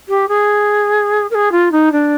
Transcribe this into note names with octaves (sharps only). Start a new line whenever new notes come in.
G4
G#4
A#4
G#4
F4
D#4
D4